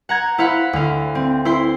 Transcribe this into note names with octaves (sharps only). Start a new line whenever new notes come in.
F#5 A#5 G#6
E4 C5 F5 F#5 B5
D2 F5
C4
E4 C5 C6